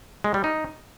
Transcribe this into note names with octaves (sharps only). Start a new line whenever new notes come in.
G#3
G3
D#4